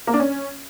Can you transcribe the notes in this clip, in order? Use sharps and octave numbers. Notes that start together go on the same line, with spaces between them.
A#3
D4
C#4